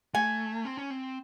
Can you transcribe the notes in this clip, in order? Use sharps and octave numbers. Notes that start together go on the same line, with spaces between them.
A3 G#5
C4
C#4
C4